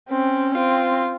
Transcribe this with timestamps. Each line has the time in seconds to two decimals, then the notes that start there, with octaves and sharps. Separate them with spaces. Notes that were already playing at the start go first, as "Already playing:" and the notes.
0.10 C4 C#4
0.55 C4 F4